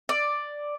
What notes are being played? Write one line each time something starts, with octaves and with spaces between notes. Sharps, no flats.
D5